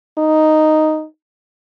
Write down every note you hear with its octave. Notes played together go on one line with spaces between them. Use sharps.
D#4